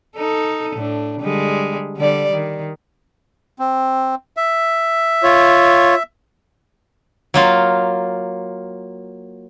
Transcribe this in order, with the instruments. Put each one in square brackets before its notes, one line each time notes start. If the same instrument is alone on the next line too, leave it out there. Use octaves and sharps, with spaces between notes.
[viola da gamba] D#4 A4
A2 D4
D3 G3 G#3
D3 G3 D5
D#3
[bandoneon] C4
E5
[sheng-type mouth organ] F4 C#5
[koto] F#3 A#3 F4